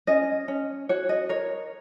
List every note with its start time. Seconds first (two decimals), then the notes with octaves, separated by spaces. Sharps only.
0.07 C#4 D#5
0.48 C#4
0.89 F#4 C#5
1.09 D#5
1.29 A#4 C#5